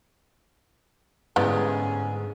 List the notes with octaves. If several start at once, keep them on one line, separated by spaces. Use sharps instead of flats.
G#2 D3 E3 G3 B3 C#4 G#4